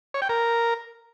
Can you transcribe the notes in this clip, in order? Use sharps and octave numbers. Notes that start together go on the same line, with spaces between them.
C#5
G5
A#4